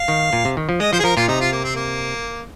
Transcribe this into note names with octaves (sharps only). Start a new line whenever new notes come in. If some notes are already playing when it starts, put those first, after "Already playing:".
Already playing: F5
D#3
A#2
C3
D#3
F3
G#3 D#5
F3 C5
G#4
F3 A#4
A#2 F4
C3 D#4
F4
A#3
C4
A#3